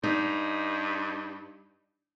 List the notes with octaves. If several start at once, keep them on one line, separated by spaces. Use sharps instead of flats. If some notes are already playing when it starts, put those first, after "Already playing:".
G2 D#4